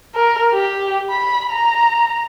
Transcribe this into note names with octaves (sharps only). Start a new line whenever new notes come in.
A#4
G4
B5
A#5